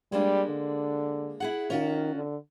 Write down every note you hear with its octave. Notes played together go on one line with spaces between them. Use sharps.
G3 G#3 A#3 D4
D3
E4 G#4 F#5
D#3 C#4 F4 F#4
D3